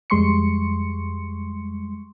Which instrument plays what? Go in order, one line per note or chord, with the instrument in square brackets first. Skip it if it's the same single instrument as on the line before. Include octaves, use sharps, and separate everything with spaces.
[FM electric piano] F2 G3 G#3 C6 C#6 C#7